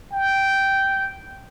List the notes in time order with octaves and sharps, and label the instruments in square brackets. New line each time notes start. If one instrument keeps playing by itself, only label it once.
[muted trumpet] G5